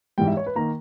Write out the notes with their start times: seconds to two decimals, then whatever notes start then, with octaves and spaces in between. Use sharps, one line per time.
0.18 G#2 E3 G3 G5
0.27 E5
0.37 C#5
0.46 B4
0.55 D#3 A#3 A#5